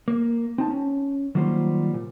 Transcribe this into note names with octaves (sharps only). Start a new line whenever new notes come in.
A#3
C4 D#4 A5
C#4
D#3 F#3 G3 A#3 F4 C5
A#2